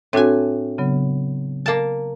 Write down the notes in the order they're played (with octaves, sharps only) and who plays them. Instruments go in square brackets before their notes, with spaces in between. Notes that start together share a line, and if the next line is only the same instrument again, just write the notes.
[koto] A2 G#5 [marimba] C4 D4 F#4
[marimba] C#3 F#3 B3
[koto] A#3 A5